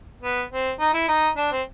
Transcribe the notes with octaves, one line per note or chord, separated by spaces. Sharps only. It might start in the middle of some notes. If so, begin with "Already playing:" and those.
B3
C4
D#4
E4
D#4
D4
C4